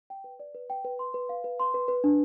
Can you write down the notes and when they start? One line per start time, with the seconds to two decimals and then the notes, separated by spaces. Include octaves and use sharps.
0.10 G5
0.24 B4
0.40 D5
0.55 B4
0.70 G5
0.84 B4
0.99 C6
1.14 B4
1.29 F5
1.44 B4
1.60 C6
1.74 B4
1.88 B4
2.04 D4